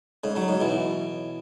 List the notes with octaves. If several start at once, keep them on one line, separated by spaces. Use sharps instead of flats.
G#2 C#3
C#3 F#3
G#2 C#3
B2 E3